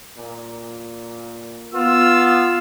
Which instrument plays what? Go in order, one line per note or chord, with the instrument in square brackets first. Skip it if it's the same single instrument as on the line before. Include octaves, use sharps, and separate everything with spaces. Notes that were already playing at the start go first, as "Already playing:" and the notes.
[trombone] A#2
[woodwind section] B3 [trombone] F4 [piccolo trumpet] E6